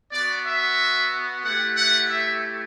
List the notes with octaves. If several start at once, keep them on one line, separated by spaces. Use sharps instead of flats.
B3 F#4 D5
E5
A3 E4 G4 F#5
F#5
E5